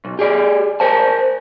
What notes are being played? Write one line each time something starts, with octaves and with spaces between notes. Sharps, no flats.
B1
G4 G#4 D5
A#4 C5 G#5 A5